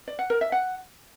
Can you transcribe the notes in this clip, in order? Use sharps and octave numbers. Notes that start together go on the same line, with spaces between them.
D5
F#5
A#4
E5
F#5